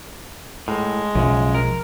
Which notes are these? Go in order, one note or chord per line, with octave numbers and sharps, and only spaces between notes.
A2 G#3
B1 F#2 C#3 F3
A#4